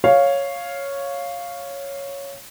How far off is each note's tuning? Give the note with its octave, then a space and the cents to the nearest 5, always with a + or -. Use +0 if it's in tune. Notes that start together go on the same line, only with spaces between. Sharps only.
C#5 +0 F5 +0